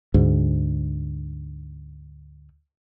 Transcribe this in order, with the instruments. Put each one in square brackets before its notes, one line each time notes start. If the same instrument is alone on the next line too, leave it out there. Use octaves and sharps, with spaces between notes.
[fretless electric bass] D2 G#2